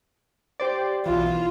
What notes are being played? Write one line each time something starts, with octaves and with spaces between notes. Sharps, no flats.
G4 C5 D5
B1 E3 F4